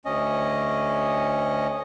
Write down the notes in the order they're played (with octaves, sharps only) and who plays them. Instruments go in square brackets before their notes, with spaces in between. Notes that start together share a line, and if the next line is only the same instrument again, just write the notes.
[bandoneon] D2 C#4 D#5